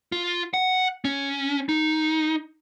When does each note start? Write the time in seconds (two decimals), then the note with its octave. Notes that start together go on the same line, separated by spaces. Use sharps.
0.12 F4
0.54 F#5
1.05 C#4
1.69 D#4